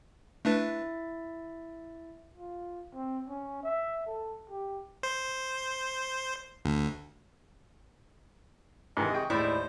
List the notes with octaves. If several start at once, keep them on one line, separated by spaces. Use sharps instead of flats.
A3 D4 E4 B4 E5 A6
F4
C4
C#4
E5
A4
G4
C5
D2
G#2 C3 D#3 E3 D#5
G#4 G5 C#6
D#2 A2 G#3 E4 C5 D5